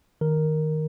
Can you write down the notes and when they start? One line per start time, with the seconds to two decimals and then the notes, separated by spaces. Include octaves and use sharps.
0.21 D#3 A#4